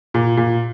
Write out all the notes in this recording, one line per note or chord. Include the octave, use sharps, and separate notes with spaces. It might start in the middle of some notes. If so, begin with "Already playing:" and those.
A#2
A#2